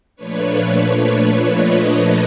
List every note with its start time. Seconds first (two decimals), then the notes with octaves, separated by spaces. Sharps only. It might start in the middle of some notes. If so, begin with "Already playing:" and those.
0.16 A#2 F3 A3 D4 B4 C#5
1.52 C#5 D#5